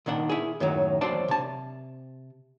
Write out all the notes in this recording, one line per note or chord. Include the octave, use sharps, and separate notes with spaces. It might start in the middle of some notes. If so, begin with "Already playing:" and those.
C2 A#2 D#3 D4 F#5
E4 G#4
F#2 A2 D#3 F#3
E2 F#3 D4 C5 D5 A5
C3 A5